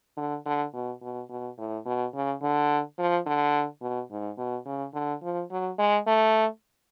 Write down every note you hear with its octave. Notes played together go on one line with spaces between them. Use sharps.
D3
D3
B2
B2
B2
A2
B2
C#3
D3
F3
D3
B2
G#2
B2
C#3
D3
F3
F#3
G#3
A3